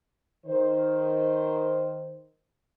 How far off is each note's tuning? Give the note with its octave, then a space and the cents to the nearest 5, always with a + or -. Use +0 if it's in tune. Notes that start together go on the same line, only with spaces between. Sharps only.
D#3 +0 C5 +0